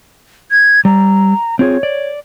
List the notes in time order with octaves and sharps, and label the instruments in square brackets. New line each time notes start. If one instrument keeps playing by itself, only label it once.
[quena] G#6
[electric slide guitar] G3 [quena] A#5
[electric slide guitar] C4 F4 G#4 [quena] C#5
[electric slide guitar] D5